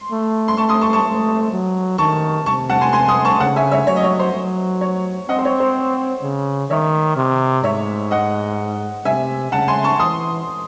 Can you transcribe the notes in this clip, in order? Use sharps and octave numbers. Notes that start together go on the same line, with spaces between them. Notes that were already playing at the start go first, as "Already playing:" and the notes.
Already playing: C6
A3
C6
A3 A5 C#6
C6 D#6
A5 C#6
A5 C#6
A3
F#3
D#3 A5 C#6
C3 A5 C#6
F#5 A5
G#5 C6
G#5 C6
C6 D#6
A5 C#6
C#3 F#5 A5
E5 G#5
C#5 E5
F#3 C#5
D#5
C#5
C5
F#3
C#5
C4 D#5 F#5
C5
C#5
C5
C#3
D#3 C#5 E5
C3
G#2 C#5 E5
D#5 F#5
C3 E5 G#5
C#3 F#5 A5
G#5 C6
A5 C#6
E3 C6 D#6